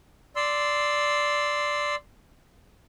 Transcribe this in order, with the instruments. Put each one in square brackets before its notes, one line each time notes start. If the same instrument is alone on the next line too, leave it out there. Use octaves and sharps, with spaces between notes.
[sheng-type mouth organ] D5 C6 E6